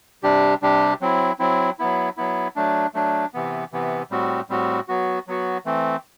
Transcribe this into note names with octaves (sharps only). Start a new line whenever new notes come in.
C3 G3 D4 G4
C3 G3 D4 G4
F#3 C4 E4
F#3 C4 E4
F#3 B3 E4
F#3 B3 E4
F#3 A3 D4
F#3 A3 D4
C3 E3 B3
C3 E3 B3
A2 G3 C4 F#4
A2 G3 C4 F#4
F#3 B3 F#4
F#3 B3 F#4
E3 A3 C4